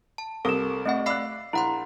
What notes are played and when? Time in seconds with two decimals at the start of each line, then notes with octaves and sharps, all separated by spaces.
0.18 A5
0.45 C2 A4 A#4 D#6 E7
0.86 A3 C4 D#5 E5 F#5
1.06 D5 F5 B5 E6 F#6 C7
1.53 A#1 E4 F#5 A#5 C6